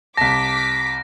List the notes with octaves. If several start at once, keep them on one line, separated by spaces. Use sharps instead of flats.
C2 A5 D6 A#6 B6